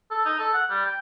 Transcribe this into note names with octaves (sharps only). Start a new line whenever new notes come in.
A4
D#4
A4
F#5
G3
G5